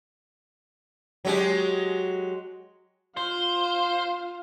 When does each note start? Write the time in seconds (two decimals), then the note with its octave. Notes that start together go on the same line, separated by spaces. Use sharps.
1.25 F#3 G#3 G4
3.17 F4 C5 F5